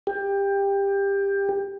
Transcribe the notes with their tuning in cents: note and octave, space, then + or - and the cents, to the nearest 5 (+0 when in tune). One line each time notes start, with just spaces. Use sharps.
G4 +20